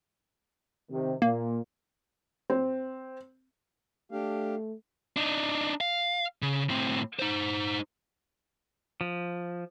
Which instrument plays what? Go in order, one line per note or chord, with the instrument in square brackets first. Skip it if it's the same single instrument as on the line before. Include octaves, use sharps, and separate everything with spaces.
[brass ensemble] C3 D#3
[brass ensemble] A#2 [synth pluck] A#3
[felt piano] C4
[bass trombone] A3 [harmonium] D4 G4 F5
[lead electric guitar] D4 D#4
F5
C#3
A2 C4
D#4 C5
[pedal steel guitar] F3